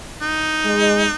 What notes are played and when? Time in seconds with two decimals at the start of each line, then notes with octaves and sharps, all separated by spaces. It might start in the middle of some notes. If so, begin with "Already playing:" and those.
0.21 D#4
0.66 G#3